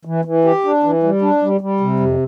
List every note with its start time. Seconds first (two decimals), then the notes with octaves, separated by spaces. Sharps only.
0.05 E3
0.25 E3
0.44 G4
0.64 D4
0.83 E3
1.03 G3
1.22 D4
1.42 G3
1.61 G3
1.80 C3
2.00 F2